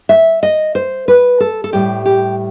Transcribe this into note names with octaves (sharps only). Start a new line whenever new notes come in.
E5
D#5
C5
B4
A4
A4
A2 G3 G4
G4